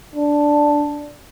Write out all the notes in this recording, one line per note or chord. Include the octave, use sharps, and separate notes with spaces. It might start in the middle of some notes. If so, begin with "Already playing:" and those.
D4